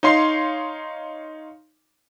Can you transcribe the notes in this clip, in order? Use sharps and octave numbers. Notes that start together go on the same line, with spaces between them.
D#4 C#5 F5 C6 C7